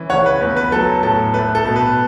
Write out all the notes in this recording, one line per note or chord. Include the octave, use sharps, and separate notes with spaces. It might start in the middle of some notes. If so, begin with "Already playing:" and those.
Already playing: E3 C#4
C#3 C#5 F#5
B4
E2 B4
B4
F#3 A4
A2 A4
A3 B4
A4
B2
B4